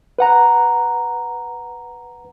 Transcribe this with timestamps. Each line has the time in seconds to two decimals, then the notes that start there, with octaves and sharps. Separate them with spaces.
0.19 B4 F#5 A#5